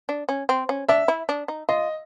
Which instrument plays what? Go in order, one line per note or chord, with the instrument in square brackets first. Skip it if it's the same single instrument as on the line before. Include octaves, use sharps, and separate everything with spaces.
[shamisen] D4
C#4
C4
C#4
[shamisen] D4 [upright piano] E5
[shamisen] E4
D4
D#4
[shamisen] F4 [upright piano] D#5